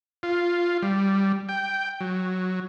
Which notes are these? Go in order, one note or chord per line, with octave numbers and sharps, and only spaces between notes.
F4
G3
G5
F#3